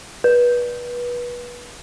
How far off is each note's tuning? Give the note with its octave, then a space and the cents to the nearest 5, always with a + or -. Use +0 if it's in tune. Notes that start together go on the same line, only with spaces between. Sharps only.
B4 -25